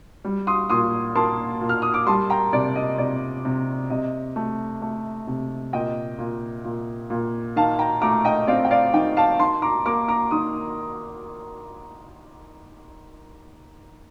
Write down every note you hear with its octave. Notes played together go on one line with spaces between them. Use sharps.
G3
C6 D#6
A#2 C6 D#6
A#3 A5 C6
A#2
F6
D#6
D6
G3 A5 C6
G5 A#5
C3 D5
D#5
C3 D5
C3
C3 D#5
A3
A3
C3
A#2 D#5 G5
A#2
A#2
A#2
D#3 F5 A5
G5 A#5
A3 A#5 D6
D#5 G5
C4 D5 F5
G5
D5 F5
D#3 D#5 G5
F5 A5
D#3 A5 C6
A#5 D6
A#3 A#5 D6
A#5 D6
D#3 C6 D#6